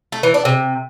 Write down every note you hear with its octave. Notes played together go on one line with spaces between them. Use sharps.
A3
E3
D4
C3